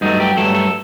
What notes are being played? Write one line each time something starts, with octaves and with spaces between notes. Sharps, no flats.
G2 F#3 A3 D#4
G4
G2 F#3 A3 A4
A4